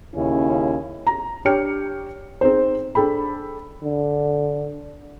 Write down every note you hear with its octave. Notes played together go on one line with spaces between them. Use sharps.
D#2 C#3 C#4 E4
A#5
D4 G4 C#5 G5 F6 C#7
C4 D#4 G#4 C5
D4 G#4 A4 G5 B5
D3